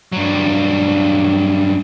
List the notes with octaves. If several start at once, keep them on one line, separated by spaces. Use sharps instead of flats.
G2 F#3